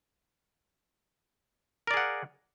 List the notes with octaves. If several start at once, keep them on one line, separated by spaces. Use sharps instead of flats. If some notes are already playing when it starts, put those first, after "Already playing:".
G#4 A#4 D5 F5 F#5